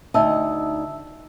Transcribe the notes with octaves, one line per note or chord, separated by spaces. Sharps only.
D2 D#4 D#5 E5 A5 E6